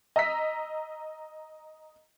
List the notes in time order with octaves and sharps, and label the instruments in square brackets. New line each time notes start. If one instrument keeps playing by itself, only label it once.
[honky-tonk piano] D#5 A#5 E6 B6